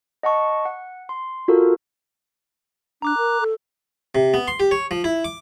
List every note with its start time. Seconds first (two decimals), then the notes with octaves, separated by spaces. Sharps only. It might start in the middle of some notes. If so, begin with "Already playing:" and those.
0.23 D#5 F#5 A5 C#6
0.65 F#5
1.09 C6
1.48 F4 F#4 A4 A#4
3.02 D4 A#5 D6 F#6
3.18 A#4
3.41 A4
4.15 C3
4.34 B3
4.48 C6
4.60 G4
4.71 C#5
4.91 F3
5.04 E4
5.25 D6